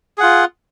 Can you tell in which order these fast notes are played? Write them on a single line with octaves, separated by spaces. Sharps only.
G#4 F#5 F4